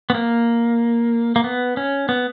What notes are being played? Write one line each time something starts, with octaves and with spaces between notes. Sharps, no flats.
B3
A#3
A#3
B3
C#4
B3